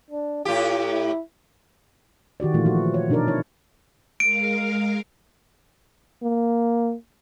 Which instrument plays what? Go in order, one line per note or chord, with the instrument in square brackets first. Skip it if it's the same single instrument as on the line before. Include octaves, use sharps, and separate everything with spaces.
[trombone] D4
[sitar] A2 G4 [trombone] F4
[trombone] E4
[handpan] D#3 F#4 G4 D5
A#2 E3 A3 F4
F3 F#4
C#5
B2 D4 D#4 A#4 D5
E4 C#5
[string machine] G#3 A#4 F5 [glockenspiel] D7
[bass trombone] A#3